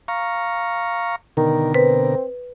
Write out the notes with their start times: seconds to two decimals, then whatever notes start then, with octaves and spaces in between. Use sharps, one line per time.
0.08 F5 A#5 C#6
1.37 B2 D3 D#3 A#4
1.74 C4 B4